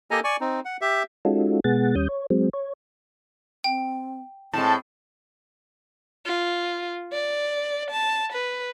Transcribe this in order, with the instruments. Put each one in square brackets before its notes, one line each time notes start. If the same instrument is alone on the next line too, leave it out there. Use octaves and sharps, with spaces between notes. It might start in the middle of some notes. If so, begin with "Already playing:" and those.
[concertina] A#3 G4 A4 D#5 G#5 A#5
D5 G#5 C#6
C4 D#4
F#5
G4 E5
[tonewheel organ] G#3 C#4 D#4 F4 F#4 A4
B2 G#3 B3 G#4 F#5 A6
D#2 G3 C#4 D#6 G6
C#5
F#3 G#3 C4
C#5
[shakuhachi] C4 [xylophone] G5
[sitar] A2 G#3 [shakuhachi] C4 [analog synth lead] A5
[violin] F4
D5
A5
B4